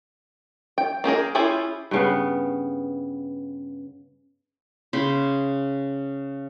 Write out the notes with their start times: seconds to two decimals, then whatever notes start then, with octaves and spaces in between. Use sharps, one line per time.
0.78 G5
1.04 A#3 G4 G#4 A#4
1.35 C#4 E4 F4 G4 G#4
1.91 G2 C#3 B3
4.93 C#3 G5 B5 C6